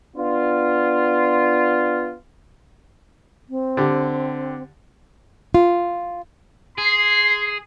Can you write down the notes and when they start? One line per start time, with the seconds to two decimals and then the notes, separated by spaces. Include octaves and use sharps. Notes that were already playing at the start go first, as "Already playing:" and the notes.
0.16 B3 D4 F4
3.50 C4
3.77 D3 G4
5.54 F4
6.78 G#4 C6